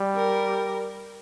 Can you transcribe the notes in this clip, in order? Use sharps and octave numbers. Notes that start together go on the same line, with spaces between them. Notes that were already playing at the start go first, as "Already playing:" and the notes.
Already playing: G3
A#4